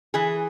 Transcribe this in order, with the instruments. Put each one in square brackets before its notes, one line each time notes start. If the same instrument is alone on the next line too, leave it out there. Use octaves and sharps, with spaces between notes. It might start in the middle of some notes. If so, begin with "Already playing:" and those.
[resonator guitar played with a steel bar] E3 G#4